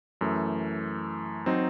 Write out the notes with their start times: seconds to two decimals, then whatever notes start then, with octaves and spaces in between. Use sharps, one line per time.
0.21 F#2 E3 A3
1.46 F#3 C4 D#4